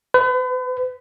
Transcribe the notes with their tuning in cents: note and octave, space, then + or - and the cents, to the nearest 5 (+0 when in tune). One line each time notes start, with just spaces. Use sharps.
B4 +40